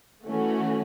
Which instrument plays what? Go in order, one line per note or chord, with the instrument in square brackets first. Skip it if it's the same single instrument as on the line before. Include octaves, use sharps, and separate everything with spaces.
[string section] E3 A3 C#4 F#4